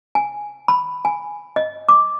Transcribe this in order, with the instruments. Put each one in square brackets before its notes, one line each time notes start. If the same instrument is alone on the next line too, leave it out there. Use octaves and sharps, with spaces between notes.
[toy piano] G#5
B5
G#5
D#5
D6